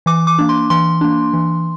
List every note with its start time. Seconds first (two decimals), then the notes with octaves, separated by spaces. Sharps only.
0.06 E3 D6
0.27 D6
0.39 A#3 D4
0.49 C6
0.70 E3 C6
1.01 A#3 D4
1.33 E3